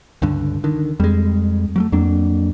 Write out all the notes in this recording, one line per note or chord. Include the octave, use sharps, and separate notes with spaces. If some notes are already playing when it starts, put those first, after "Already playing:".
C#2 G2 D3
D3 D#3
F2 G3 G#3
F#3 G3 A3
F2 F#3 A#3 D4